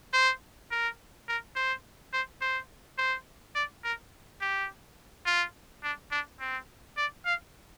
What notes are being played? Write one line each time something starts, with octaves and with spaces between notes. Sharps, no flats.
C5
A#4
A#4
C5
C5
C5
C5
D5
A#4
G4
F4
D4
D4
C4
D5
F5